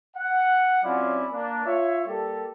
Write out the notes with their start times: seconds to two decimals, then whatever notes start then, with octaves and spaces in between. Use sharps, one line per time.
0.17 F#5
0.84 F#3 C4 C#4 E4 F4 D5
1.32 A#3 D4
1.66 F4 C#5 E5
2.07 G3 A#3 G4 A4